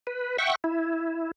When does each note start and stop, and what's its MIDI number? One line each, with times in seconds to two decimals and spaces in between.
0.07 0.37 71
0.38 0.55 76
0.38 0.55 78
0.38 0.55 79
0.38 0.55 85
0.64 1.31 64